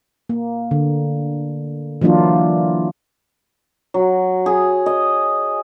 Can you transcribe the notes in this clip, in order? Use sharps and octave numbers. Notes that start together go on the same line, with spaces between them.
A#3
D3
E3 F#3 A#3 D4 F4
F#3
G#4
D#5